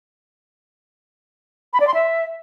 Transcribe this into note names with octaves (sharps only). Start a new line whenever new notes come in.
B5
D5
C6
E5